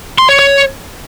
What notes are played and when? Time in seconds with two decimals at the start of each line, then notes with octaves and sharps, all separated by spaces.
0.18 C6
0.29 C#5
0.39 C#5